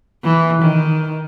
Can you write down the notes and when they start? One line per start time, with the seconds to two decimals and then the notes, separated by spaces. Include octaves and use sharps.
0.24 E3
0.62 D#3